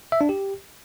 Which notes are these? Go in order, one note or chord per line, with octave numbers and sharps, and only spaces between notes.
E5
D4
G4